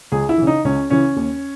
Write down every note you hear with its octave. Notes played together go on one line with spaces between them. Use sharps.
C#2 G#4
E4
C#3 E3
D#4
C#2 C#4
C#3 E3 C#4
D#2